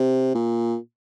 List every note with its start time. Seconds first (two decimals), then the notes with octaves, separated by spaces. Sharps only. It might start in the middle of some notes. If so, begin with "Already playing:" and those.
Already playing: C3
0.34 A#2